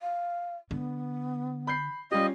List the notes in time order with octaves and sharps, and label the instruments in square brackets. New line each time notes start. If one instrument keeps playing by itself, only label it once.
[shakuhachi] F5
[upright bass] D3 [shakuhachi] B3
[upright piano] B5 G6 C7
[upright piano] G3 F4 G4 [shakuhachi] C#4 [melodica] D#5